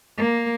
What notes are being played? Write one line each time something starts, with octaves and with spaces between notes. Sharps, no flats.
A#3